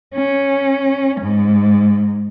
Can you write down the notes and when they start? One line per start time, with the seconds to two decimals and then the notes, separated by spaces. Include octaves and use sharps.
0.15 C#4
1.21 G#2